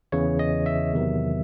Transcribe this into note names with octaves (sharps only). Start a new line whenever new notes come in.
E2 C#3 E3 C#5
D#5
E5
E2 C3 D#3 F#3